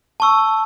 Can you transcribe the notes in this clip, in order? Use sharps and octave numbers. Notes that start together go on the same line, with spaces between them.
A5 C#6 E6